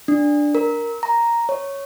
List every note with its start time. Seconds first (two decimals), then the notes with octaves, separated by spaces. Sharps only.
0.08 D4
0.55 A#4
1.03 A#5
1.49 C#5